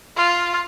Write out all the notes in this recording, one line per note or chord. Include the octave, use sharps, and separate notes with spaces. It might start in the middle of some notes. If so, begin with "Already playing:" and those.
F4